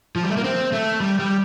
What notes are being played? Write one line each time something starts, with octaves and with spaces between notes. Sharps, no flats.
F3
G3
A3
A#3
C4
A3
G3
G3